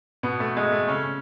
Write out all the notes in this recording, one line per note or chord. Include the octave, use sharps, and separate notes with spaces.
B2 B3
A3
G#3
A3
C#3 C#4